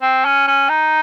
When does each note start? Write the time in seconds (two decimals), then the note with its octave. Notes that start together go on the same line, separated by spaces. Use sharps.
0.02 C4
0.25 C#4
0.48 C#4
0.69 D#4